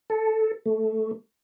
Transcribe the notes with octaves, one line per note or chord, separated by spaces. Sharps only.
A4
A3